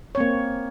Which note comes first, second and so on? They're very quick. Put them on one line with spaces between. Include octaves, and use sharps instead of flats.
C#5 C4 A#3